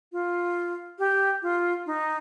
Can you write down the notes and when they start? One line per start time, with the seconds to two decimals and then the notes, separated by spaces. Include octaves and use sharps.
0.12 F4
0.99 G4
1.42 F4
1.86 D#4